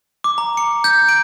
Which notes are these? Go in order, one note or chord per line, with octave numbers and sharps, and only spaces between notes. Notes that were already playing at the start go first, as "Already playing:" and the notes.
D6
A#5
C#7
G6
D7